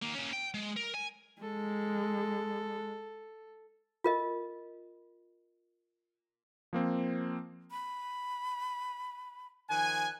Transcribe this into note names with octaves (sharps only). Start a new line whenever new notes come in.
D#3 A#3
A#3 C#4
G5
G#3
A#4
G#5
G#3 A4
F4 A#4 D#5
F3 A#3 C4
B5
D#3 F3 G#5 F#6